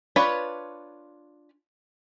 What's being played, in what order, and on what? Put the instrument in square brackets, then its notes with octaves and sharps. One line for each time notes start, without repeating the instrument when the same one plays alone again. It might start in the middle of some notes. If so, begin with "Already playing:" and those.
[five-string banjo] D4 F4 B4 C#5 B5